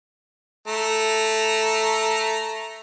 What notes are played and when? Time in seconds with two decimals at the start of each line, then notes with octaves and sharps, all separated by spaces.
0.67 A3 A#5